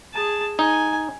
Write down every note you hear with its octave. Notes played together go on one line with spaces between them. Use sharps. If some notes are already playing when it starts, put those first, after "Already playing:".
G#4 A5
D#4 G#5